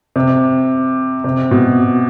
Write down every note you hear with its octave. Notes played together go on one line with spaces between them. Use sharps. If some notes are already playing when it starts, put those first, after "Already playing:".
C3
C3
B2